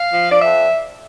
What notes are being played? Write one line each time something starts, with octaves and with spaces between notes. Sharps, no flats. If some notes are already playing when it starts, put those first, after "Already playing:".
Already playing: F5
F3
D5
F2 E5